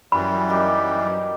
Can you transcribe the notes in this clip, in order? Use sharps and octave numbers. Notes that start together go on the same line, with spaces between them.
F#2 E3 G3 B5
A#3 D#4 G4